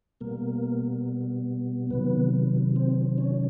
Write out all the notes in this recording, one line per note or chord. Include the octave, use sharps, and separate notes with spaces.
B2 G3 A#3 B3 A#4
C3 D#3 F#3 B3 B4
C4 C5
C#4 C#5